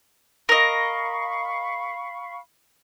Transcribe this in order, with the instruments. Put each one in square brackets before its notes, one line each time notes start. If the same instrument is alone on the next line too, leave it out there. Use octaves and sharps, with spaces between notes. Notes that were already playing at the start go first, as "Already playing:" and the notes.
[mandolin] A#4 D#5 [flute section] F5 B5 C#6